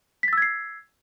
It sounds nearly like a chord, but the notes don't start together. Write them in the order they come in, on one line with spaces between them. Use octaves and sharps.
B6 A6 E6 G#6 C7